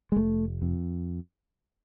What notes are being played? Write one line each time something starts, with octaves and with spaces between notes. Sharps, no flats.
G#3
F1 A3
F2